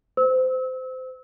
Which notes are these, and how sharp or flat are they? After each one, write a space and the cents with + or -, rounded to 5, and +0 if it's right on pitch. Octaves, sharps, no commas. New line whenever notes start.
C5 -25 E6 -30